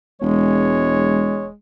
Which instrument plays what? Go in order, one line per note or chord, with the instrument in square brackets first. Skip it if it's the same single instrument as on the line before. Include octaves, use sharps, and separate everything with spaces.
[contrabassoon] E1 [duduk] G#3 [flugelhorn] C#5